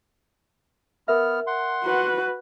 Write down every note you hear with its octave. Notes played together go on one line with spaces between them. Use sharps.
B3 A#4 E5 F6
F#5 C6
F#4 B4